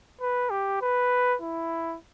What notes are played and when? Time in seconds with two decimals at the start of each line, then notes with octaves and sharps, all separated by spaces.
0.21 B4
0.50 G4
0.81 B4
1.42 E4